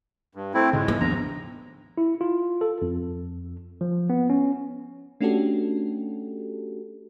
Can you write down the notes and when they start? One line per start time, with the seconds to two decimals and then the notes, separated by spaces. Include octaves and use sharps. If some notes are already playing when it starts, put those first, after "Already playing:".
0.35 G2
0.54 A3 C4 E4
0.73 G#2 C#3 G#3
0.88 B3
1.01 D#2 F3 D4 A#5
1.98 E4
2.21 F4
2.61 A4
2.82 F2
3.81 F3
4.10 B3
4.30 C#4
5.21 A3 C#4 D4 F#4 G4 A4